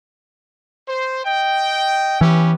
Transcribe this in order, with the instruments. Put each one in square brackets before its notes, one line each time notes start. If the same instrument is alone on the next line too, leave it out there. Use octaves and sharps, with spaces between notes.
[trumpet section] C5
D#5 G5
[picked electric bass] E3 [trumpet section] B3 C#4 G4